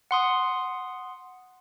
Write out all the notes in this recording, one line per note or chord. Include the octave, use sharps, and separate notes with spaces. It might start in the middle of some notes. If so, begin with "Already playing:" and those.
F#5 C6 D#6